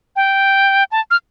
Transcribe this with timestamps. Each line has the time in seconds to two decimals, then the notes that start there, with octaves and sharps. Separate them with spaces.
0.16 G5
0.92 A5
1.11 F6